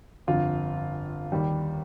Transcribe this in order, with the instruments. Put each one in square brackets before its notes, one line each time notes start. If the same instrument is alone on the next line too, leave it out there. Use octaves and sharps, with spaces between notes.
[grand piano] G1 F2 D3 F4
D#2 D#3 G3